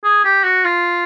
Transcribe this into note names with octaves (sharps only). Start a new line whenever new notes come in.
G#4
G4
F#4
F4